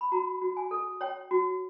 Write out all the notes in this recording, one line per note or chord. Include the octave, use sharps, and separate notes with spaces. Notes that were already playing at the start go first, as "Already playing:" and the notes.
B5
F#4 A#5
F#4
G#5
A4
C#5 G5
F#4